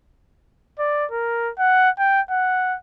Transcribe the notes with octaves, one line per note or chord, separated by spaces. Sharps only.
D5
A#4
F#5
G5
F#5